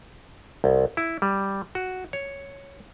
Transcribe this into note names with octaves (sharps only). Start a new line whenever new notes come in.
C2
E4
G3
F#4
C#5